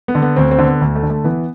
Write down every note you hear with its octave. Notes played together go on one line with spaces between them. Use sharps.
B3
D3
B3
D2 C4
C4
D3
B3
D2
A3
D3
A3
E3 B3